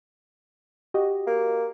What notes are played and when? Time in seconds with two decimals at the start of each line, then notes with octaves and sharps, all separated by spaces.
0.94 F#4 G4 D#5
1.27 A#3